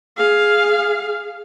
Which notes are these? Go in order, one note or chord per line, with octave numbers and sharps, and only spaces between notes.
G#4 F5